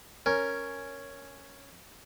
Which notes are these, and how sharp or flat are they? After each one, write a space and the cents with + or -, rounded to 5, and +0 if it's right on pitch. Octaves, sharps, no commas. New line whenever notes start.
C#4 +0 A#4 +0